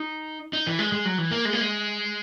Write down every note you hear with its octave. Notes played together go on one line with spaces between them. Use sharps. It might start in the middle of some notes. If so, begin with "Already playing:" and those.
Already playing: D#4
D#4
E3
G#3
G#3
F#3
E3
A#3
G#3
A#3
G#3